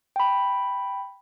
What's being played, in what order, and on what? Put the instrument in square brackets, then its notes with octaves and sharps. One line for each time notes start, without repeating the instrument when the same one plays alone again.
[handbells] G5 B5